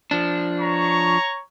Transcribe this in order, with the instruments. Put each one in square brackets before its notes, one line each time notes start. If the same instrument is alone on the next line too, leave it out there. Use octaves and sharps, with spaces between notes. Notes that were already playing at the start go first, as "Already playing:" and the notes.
[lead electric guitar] F3 D4
[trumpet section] C#5 A#5 C#6